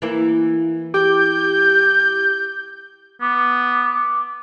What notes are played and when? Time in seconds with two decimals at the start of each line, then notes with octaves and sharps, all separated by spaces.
0.02 E3 A#3 E4
0.94 G4 D6 G6
3.21 B3 D6